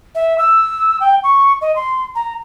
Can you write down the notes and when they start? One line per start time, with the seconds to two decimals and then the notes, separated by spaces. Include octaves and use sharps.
0.15 E5
0.38 E6
1.00 G5
1.24 C#6
1.61 D#5
1.76 C6
2.15 A#5